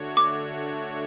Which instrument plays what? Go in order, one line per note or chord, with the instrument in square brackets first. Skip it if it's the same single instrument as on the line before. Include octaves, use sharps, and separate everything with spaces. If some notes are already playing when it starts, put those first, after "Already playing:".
Already playing: [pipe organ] D3 A3 D4 F#4 C#5
[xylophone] D6